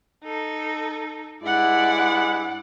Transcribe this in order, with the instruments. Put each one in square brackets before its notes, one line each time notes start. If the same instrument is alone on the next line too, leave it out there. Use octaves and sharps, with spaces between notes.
[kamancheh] D#4 A4
[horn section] G2 G#3 E4 [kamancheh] D5 F#5